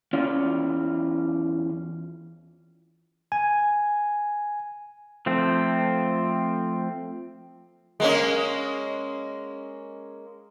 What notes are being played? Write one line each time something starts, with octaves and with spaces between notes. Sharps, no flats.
E2 C#4 F4 D5
G#5
F3 A3 C4
G#3 A#3 C#4